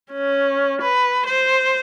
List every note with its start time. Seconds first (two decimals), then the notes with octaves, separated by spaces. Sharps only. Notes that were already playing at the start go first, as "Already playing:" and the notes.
0.12 C#4
0.82 B4
1.26 C5